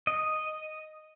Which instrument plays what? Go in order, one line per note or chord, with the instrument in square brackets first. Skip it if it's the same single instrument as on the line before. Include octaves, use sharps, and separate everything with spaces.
[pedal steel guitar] D#5